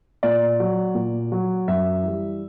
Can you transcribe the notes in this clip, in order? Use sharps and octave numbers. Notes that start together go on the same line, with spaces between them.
A#2 D5
F#3
A#2
F#3
F#2 E5
E3 G3